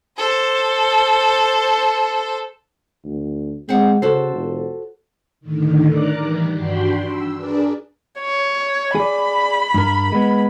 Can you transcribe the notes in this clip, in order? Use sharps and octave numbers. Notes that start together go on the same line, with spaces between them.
A4 C5
D2
G#3 C4 F#5
C#3 F#4 A4 C5
F1
A2 D3 D#3
A#4 D5 A#5 D6 F#6
D#3 E3 G3
G2 D4 F#4 G5 B5 C6
E6
D4 G#4 A#4 B4 D5
C#5
G#4 D5 B5
G2 A#4
G#3 B3